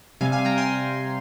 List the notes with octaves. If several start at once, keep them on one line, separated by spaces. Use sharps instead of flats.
C3 G3 F5 G#5
F5 G#5
G5 A#5
G#5 C6